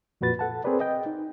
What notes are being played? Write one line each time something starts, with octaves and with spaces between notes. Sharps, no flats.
F2 A#2 F#4 B4 A6
A4 F#5 A5
C4 G#4 A#4 B4 D5
D#5 G5
D#4